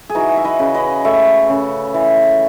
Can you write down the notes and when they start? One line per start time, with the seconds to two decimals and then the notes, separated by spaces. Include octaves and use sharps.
0.09 G#4
0.15 E3 D#4 F#4
0.37 E5
0.45 B4 D#5
0.59 C#3
0.74 B4 D#5
1.04 A3 C#5 E5
1.49 C#3
1.94 E3